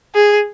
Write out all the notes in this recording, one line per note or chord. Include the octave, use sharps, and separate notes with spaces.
G#4